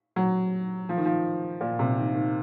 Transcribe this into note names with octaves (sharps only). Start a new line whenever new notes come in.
F#3
F3
D#3
F3
A#2
C3
D#3
D#3